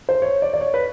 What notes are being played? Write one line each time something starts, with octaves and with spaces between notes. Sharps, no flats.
C5
C#5
D5
D5
C#5
B4